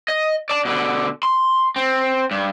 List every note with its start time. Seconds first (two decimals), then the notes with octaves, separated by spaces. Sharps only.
0.08 D#5
0.50 D5 A5
0.65 B2 D3
1.23 C6
1.76 C4
2.31 G2